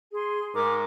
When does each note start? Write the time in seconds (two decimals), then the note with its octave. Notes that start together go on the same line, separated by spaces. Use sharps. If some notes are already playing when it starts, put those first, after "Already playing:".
0.12 G#4 C6
0.54 G#2 A#4 D6